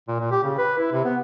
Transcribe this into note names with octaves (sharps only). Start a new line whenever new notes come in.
A#2
A#2
G4
C#3
B4
E4
C3
B3